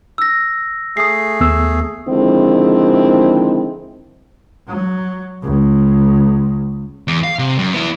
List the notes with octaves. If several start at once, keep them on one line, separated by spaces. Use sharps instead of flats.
E6 A#6
A3 G#4 D#6 C7
D#2 B3 E6
D3 D#3 F3 G#3 C4 E4
F#3
C#2
E2
F5
C3
F#2
B3 E4